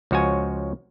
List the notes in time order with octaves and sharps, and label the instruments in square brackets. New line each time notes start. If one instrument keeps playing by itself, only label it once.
[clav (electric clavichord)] C#2 F3 F#4 C#5 G#5